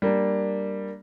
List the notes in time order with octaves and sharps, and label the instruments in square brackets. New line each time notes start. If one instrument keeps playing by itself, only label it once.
[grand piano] G3 A#3 D4